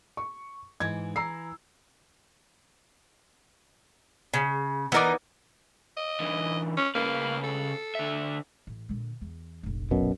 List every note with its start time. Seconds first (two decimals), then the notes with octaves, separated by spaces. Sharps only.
0.17 C#6
0.80 G#2 E3 G#6
1.16 E3 A#5 E6 C7
4.34 C#3
4.92 E3 B3 D#4 A#4 D5
5.97 D#5
6.20 D3 E3
6.77 C#4
6.95 C#3 A#3 B4
7.44 A4
7.95 D3 E5
8.67 A1
8.89 A#2 D3
9.21 E2
9.63 F1 A#1
9.91 F#2 B2